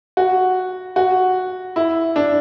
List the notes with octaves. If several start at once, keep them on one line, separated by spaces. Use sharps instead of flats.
F#4
F#4
E4
D4